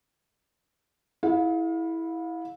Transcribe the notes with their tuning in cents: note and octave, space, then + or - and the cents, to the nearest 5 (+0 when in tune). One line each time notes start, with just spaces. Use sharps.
E4 -10 G#4 +30 F5 +35